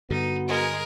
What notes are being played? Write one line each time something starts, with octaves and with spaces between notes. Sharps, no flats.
G2 D3 B3 D#4 F#4
G#3 G#4 A#4